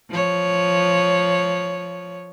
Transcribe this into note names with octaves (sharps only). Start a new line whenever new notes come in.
F3 C#5